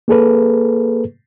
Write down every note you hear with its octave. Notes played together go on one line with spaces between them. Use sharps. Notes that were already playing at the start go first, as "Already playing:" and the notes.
A#3 G#4 A4 B4